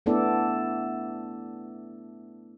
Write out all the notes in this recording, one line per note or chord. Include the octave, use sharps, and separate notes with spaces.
A3 B3 D4 E4 A4 D5